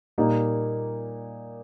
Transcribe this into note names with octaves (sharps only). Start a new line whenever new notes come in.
A#2 G3 A#3 D#4